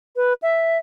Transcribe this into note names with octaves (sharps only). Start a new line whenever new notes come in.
B4
E5